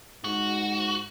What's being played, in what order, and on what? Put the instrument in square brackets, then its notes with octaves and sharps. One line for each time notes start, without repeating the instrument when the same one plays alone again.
[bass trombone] G#2 [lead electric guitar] F#4